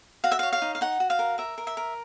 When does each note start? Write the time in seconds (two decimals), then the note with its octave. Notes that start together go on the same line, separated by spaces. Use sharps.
0.24 F#4 F5
0.31 E5
0.39 C#5 F5
0.52 F5
0.62 D#4
0.75 F5
0.81 D#4 F#5
1.00 F#4
1.10 F5
1.19 A#4
1.38 A#4 E5
1.58 A#4
1.67 E5
1.77 A#4